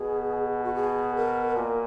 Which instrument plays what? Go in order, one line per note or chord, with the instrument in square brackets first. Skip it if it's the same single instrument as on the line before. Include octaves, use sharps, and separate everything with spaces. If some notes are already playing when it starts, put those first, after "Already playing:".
Already playing: [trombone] B2 [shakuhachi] G#4
[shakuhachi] F#4
G#4
A#4
[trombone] A#2 [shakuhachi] A#4